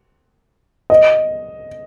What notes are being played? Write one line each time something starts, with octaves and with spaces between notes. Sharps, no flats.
D#5